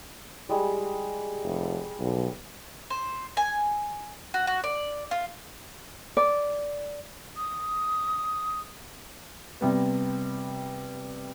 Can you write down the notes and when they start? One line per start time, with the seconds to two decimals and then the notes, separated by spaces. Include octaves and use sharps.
0.49 G3 G#3
1.43 F1
2.00 B1
2.90 C5
3.37 G#5
4.34 F#4
4.47 F#4
4.64 D5
5.11 F4
6.17 D5
7.36 D#6
9.61 C3 G3 B3